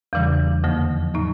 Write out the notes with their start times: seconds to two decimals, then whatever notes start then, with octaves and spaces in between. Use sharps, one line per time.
0.13 E2 C#3 E3 G3
0.64 F2 D3 F3 A#3
1.14 A2 F#3 A#3 D#4